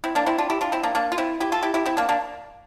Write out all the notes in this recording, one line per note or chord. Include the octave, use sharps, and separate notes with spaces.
C4 E4
A#3 D4
C4 E4
D4 F4
E4 G4
D4 F4
C4 E4
A#3 D4
A#3 D4
F4
C4 E4
E4 G4
F4 A4
E4 G4
E4 G4
C4 E4
A#3 D4
A#3 D4